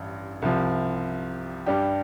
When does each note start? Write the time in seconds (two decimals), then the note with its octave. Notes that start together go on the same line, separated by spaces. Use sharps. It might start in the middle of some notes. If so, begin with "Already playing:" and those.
Already playing: A1 G2
0.42 C2 C3 F3
1.66 G2 G3 D4 G4